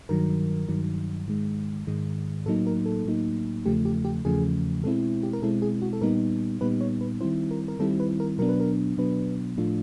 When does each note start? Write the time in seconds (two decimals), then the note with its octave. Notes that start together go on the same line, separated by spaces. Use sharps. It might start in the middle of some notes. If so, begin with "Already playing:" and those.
0.09 G2 D#3 F#3 A#4
0.68 G2 D#3 F#3
1.28 G#2 D#3 G#3
1.87 G#2 D#3 G#3
2.46 A2 F#3 A#3 D#4 A4
2.67 A#4
2.86 A4
3.05 A2 F#3 A#3 D#4
3.65 E2 C#3 F3 A3 G4
3.85 G4
4.05 G4
4.25 E2 C#3 F3 A3 G#4
4.83 B2 G#3 C4 E4 A4
5.23 G4
5.33 A#4
5.42 B2 G#3 C4 E4 A4
5.62 G#4
5.82 F#4
5.93 A4
6.01 A#2 G3 B3 D#4 A#4
6.61 A#2 G3 B3 D#4 B4
6.81 C#5
7.01 B4
7.21 D#3 G3 C4 E4 C5
7.51 A#4
7.68 A#4
7.79 D#3 G3 C4 E4 A4
8.00 B4
8.20 A#4
8.38 B2 F#3 B3 D4 A#4
8.49 B4
8.60 A#4
8.98 B2 F#3 B3 D4 B4
9.57 A2 F3 A3 D4 F4